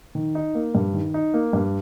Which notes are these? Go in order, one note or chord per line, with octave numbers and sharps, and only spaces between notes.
D#3
D#4
A#3
G2
D#3
D#4
A#3
G2